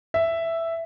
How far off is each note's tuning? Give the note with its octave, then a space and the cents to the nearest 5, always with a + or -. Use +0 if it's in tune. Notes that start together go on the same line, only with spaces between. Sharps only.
E5 +5